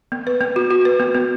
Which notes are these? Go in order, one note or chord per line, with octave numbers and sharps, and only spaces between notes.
B3
B4
B3
F#4
F#4
B4
B3
B3